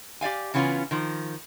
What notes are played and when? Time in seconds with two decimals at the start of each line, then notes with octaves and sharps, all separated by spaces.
0.21 G4 D5 F5 G#5
0.54 C#3 E3 B3 C#4 F4
0.91 D#3 F3